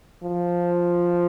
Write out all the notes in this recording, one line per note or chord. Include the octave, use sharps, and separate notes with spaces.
F3